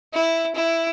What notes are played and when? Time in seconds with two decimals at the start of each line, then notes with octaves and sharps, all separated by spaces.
0.14 E4
0.55 E4